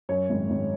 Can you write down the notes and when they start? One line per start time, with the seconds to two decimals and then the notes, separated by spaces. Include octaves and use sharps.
0.09 F#2 C#5
0.30 G#1
0.50 G#1